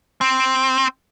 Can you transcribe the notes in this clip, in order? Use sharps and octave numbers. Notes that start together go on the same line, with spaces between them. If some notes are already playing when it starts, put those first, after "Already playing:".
C4